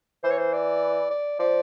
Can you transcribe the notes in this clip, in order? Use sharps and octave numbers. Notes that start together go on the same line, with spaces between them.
E3 C5
C#5
C5
D5
D5
F3 D5